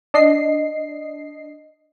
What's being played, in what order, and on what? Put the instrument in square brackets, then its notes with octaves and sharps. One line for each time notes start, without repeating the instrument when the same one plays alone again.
[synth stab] D4 D#5 C7